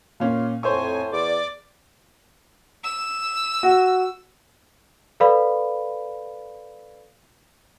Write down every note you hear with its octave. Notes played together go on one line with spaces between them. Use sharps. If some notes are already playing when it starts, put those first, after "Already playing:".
A#2 C#4 F4
F2 A2 C5 C#5 G#5 C#6
E2 D5 D6
E6
F#4
A4 B4 D5 F5 B5